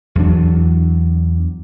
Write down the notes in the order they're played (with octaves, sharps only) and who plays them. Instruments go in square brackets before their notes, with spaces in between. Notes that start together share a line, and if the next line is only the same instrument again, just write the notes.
[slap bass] E2 F#3 D4